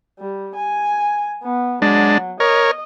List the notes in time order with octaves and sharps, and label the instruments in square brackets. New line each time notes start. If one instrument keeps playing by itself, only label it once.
[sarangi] G3
G#5
B3
[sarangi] F#3 [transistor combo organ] G#3 D4
[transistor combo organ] A#4 C#5 [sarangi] D#5